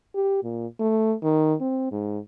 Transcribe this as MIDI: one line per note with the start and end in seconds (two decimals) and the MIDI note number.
0.15 0.41 67
0.44 0.67 46
0.80 1.14 57
1.23 1.54 51
1.61 1.91 60
1.92 2.19 44